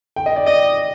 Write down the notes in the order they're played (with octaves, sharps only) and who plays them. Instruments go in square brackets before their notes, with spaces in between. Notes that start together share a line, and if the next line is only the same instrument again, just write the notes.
[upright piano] G5
D#5
D5
[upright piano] D5 [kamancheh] D#5